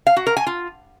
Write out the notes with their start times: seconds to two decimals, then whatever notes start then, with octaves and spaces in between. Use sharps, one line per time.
0.07 F5
0.17 F#4
0.27 A#4
0.37 G#5
0.47 F4